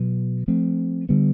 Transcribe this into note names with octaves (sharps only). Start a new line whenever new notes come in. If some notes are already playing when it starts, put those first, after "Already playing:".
Already playing: B2 F#3 B3
F3 A3 C4
D3 G3 B3